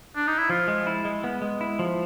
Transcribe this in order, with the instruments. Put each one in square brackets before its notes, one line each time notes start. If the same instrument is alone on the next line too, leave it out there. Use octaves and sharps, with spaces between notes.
[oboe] D4
D#4
E4
[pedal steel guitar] F3 [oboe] F4
[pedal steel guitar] G#3
E4
G#3
B3
G#3
E4
F3